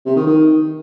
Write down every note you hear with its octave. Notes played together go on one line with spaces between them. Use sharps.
C3
D#3
D#3